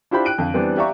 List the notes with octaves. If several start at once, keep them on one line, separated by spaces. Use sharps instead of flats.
D4 E4 F4 G4 C5 B5
G5 F#6 D7 D#7
F2 D3 F5
E3 G3 B3 C4 D4
G4 D5 E5 F5 A#5 C#6